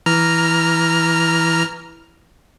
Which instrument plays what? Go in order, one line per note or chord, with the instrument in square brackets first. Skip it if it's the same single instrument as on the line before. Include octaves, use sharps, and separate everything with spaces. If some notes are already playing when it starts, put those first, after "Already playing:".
[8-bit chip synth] E3 A#5 F6